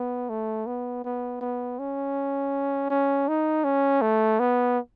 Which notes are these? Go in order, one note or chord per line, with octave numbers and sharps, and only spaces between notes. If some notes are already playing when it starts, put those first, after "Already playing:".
Already playing: B3
A3
B3
B3
B3
C#4
C#4
D#4
C#4
A3
B3